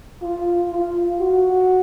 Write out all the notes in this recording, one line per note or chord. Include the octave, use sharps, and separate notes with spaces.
F4
F4
F#4